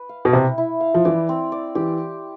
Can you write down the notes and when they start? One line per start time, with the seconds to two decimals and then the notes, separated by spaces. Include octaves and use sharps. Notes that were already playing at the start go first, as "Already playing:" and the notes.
Already playing: B4
0.09 F5
0.25 B2
0.33 C3 E4
0.58 E4
0.81 F5
0.94 F3
1.05 E3 D5
1.29 C4
1.52 D5
1.75 E3 G4